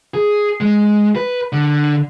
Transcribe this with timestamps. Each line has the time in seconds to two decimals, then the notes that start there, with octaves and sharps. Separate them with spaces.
0.14 G#4
0.61 G#3
1.16 B4
1.52 D3